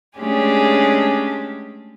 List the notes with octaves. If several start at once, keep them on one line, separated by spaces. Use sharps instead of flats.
G#3 A3 C#4 D4 G4 G#4